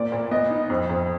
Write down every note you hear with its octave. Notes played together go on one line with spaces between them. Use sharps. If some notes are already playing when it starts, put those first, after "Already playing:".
Already playing: A#2 D5
A#2
B3 D#5
D#4
F2
F2